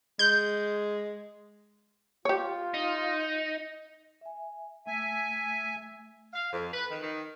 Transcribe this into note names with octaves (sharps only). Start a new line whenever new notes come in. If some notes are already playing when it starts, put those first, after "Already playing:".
G#3 G6
F4 G4 C#5
D#4
E5 G#5
A3 E5 G#5
F5
F2
B4
D#3
D#3